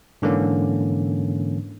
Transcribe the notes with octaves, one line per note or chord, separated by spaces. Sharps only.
G#2 D3 E3 A#3 C#4